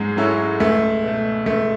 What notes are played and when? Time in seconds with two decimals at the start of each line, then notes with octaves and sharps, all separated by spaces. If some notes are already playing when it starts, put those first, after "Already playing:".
Already playing: G#2 F#3 G#3 C#4
0.17 F#3 C#4 E4 A4
0.60 C#2 A3
1.02 B2 A3
1.46 C#2 A3